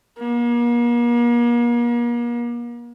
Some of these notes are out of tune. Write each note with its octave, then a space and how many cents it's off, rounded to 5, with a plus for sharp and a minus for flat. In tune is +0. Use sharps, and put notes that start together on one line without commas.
A#3 +40